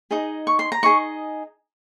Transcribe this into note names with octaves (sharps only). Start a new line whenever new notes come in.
D#4 G#4 D#5
C#6
C6
A#5
D#4 G#4 D#5 C#6